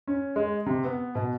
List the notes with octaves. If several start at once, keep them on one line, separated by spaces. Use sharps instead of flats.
C#4
G#3
C3
B3
B2